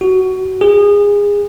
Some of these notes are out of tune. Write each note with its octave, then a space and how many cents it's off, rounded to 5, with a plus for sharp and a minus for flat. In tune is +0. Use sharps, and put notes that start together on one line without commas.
F#4 +15
G#4 -25